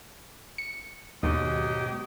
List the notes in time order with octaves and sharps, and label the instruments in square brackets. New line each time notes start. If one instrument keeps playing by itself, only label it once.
[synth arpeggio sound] C#7
[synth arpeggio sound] D#2 [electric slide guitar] G#2 B2 [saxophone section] F#3 G4 D#5